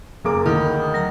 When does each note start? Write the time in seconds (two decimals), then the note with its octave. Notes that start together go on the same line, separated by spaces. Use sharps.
0.24 F#1 A#3 D6
0.46 D2 D#3 F5 B5 D#6
0.94 F#3 A#4 A#5